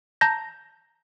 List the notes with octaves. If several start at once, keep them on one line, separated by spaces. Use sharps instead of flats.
A5 A#5 G6 A#6